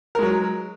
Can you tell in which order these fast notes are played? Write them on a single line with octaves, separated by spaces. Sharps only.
A#4 G#3 F#3